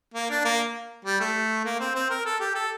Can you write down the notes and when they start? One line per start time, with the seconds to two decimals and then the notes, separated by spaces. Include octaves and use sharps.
0.14 A#3
0.30 D4
0.45 A#3
1.05 G3
1.20 A3
1.65 A#3
1.80 C4
1.95 C4
2.10 A#4
2.26 A4
2.40 G4
2.55 A4